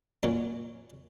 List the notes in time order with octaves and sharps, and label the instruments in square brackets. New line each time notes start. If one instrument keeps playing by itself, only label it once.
[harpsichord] A#2 F#3 C#4